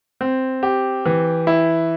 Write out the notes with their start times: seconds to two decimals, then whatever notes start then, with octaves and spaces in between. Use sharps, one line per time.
0.21 C4
0.63 G4
1.06 E3
1.47 E4